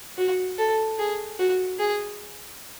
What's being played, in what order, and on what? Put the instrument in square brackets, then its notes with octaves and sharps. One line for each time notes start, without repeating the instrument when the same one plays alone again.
[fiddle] F#4
A4
G#4
F#4
G#4